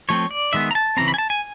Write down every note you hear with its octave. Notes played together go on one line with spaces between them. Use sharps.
F3 A3 C4 C#5
D5
D#3 G#3 B3 E5
A#5
A5
C#3 E3 G3 C4 A#5
B5
G#5
A5
G#5